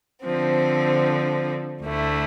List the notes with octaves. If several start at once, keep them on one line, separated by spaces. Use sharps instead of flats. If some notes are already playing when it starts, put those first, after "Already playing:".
D3 F3 C4
D2 D3 A3 E4